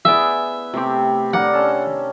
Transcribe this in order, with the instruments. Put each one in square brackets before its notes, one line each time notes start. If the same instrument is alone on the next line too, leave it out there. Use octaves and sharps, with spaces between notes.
[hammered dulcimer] B3 E4 [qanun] G#4 D5 [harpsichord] E5
[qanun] C3 C4 [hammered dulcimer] A3 G4
[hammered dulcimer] D3 A#4 D5 [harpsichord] F#5
[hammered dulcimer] C#4 A4